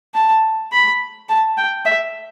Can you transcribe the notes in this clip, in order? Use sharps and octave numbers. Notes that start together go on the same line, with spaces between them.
A5
B5
A5
G5
E5